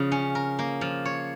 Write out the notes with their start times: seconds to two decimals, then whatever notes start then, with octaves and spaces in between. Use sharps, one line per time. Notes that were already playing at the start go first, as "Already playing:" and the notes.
Already playing: C#3 F3 F4
0.12 C#4
0.35 A#4
0.59 A#3
0.81 F3
1.05 C#5